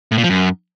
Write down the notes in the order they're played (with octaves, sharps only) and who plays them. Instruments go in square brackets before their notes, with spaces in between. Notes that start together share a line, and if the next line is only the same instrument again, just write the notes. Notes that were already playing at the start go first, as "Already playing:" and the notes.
[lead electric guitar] A2
A#2
F3
F#2